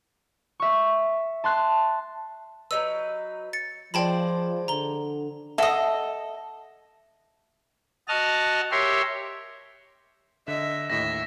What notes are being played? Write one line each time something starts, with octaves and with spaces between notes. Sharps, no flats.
E5 C#6
A5 C6 F#6
F#3 D#4 B4 E6
A6 C#7
F3 G#3 C5 D5 G5 A5 B5
D3 A#5 G7
A4 D#5 E5 F#5
F#4 D#5 A5 F6
G4 A#4 C#5 E5 C6
D3 D#5 E5
D#2 A2 E5 A#6